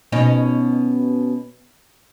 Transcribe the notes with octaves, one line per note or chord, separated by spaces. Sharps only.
B2 C#4 D#4